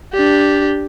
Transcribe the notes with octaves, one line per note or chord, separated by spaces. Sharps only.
D4 G4